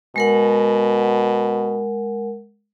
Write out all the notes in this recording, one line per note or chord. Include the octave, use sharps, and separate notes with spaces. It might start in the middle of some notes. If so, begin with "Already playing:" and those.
B2 G#3 A#4 F#5